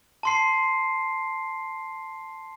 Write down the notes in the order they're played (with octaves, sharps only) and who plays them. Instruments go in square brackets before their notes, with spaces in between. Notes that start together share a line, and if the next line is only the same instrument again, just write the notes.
[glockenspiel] A5 C6 C7